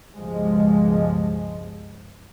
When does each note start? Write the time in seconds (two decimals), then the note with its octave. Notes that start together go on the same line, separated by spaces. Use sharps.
0.15 C#2 G2 B2 F3 G#3